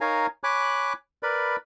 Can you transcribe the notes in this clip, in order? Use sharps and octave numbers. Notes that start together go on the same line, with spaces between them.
D#4 A#4 C#5 F5 G#5 A#5
C#5 G#5 B5 D6 F#6
A#4 B4 D5 B5